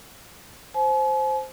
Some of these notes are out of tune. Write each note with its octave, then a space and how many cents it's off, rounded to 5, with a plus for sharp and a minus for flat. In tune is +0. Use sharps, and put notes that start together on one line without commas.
C5 +0 G#5 +45